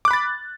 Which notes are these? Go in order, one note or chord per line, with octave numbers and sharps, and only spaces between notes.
B5 D6 F#6 A6